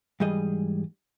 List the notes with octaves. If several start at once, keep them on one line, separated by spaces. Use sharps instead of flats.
G#2 E3 G3 G#4 D#5